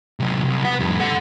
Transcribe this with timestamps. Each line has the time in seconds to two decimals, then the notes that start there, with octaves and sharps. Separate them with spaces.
0.20 C3 F#3
0.44 C2
0.65 B4 F#5
0.80 F2 G3
1.00 A4 F#5